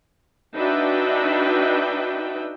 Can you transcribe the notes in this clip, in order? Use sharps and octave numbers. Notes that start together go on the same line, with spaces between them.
D4 D#4 F#4 B4 E5 G5